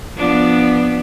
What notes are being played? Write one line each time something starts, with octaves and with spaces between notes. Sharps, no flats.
F3 B3 D4